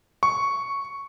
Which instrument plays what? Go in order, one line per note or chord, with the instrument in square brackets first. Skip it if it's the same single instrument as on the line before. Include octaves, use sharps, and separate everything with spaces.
[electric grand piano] C#6